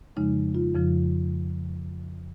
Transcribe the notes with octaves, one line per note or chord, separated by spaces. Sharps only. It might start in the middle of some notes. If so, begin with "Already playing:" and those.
F2 C#3 F3 G#3 D#4
F4
F2 C#3 F3